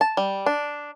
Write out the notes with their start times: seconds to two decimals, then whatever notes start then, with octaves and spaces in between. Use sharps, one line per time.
0.01 A5
0.17 G3
0.46 D4